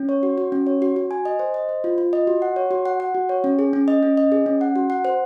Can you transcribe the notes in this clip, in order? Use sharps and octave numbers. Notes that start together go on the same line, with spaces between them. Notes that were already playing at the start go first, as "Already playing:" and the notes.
Already playing: C#4
C#5
F#4
F#4
C#4
C#5
F#4
F#4
G#5
D#5
C5
D#5
C5
F4
F4
D#5
F#4
F#5
C#5
F#4
F#5
F#5
F#4
C#5
C#4
G#4
C#4
D#5
C#4
D#5
G#4
C#4
F#5
F#4
F#5
C5